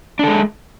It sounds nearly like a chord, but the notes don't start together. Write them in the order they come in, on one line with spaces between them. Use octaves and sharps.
D4 A4 G#3